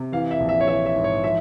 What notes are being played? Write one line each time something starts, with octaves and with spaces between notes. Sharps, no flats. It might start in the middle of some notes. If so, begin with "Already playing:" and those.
Already playing: C3
E3 F5
E5
A#1
E5
C#5
E3 E5
E5
G#2
C#5
F3 E5